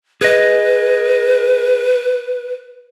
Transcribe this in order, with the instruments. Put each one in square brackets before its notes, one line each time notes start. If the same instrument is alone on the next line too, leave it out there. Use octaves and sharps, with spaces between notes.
[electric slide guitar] G#4 D#5 [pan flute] B4